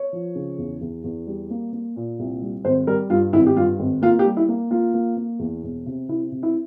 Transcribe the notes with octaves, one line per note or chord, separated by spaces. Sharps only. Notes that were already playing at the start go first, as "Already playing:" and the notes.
Already playing: C#5
F3
C#3
E2
E2
E2
G3
A#3
A#3
A#2
C2
G3
G#1 C5
G3 A#4
G2 F4
G#1 E4
G4
G2 F4
G#1
A#3 F4
G4
G3
E4
A#3
A#3 F4
A#3
A#3
E2
E1
C3
C3 E4
C3
E4